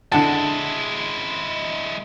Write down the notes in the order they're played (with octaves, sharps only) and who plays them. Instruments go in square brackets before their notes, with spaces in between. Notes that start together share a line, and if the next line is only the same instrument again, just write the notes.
[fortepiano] D3 F#5 A5 [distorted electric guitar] G#3 E4